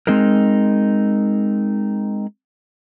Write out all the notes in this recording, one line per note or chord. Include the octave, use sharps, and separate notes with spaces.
G#3 C4 D#4 G#4 A#4